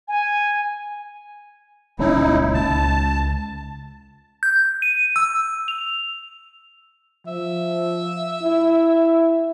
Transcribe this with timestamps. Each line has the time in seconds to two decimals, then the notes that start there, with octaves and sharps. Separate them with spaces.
0.08 G#5
1.99 D#1 C#2 C#4 D#4 E4
2.54 C#2 A5
4.43 G6
4.82 D#7
5.16 E6
5.68 F7
7.27 F3 E5
8.42 E4